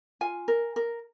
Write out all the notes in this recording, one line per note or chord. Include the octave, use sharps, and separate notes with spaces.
F4 G#5
A#4
A#4